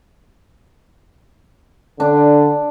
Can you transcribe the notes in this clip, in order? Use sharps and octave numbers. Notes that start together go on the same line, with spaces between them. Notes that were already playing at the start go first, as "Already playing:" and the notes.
D3 D4